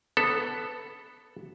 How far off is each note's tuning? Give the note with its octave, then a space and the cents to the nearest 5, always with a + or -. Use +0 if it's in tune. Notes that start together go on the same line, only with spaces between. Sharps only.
B3 +0 A4 +0